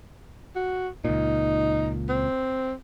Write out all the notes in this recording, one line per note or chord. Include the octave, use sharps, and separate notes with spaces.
F#4
C#2 A#2 D#4
C4